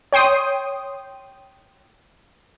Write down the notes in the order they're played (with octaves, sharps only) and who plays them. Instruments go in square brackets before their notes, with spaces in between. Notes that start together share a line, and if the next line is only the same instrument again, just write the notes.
[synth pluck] C#5 G5 C6 D#6